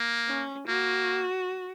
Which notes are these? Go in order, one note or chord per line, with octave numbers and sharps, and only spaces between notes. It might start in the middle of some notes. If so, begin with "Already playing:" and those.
Already playing: A#3
C#4
A#3 F#4